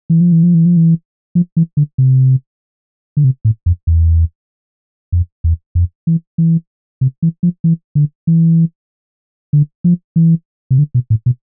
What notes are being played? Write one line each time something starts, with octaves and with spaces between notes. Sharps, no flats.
E3
F3
E3
F3
E3
F3
E3
F3
E3
D3
C3
D3
C3
A2
F2
E2
F2
E2
F2
E3
E3
C3
E3
F3
E3
D3
E3
D3
F3
E3
C3
D3
B2
A2
B2